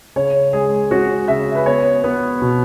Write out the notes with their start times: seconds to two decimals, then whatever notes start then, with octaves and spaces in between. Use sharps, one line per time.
0.16 C#3 C#5
0.53 G#3 G#4
0.91 C#4 F#4
1.28 C#3 E5
1.55 B4
1.66 B3 C#5
2.04 B3
2.42 B2